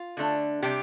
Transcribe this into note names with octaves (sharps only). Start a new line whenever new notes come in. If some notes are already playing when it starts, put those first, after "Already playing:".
Already playing: F4
D3 A3 D4
C3 G3 D4 G4